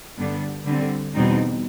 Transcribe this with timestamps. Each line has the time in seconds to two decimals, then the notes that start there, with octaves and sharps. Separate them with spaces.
0.18 G2 D3 G3 B3 D4
0.66 D3 G3 C4
1.14 E2 B2 G3 C4 D#4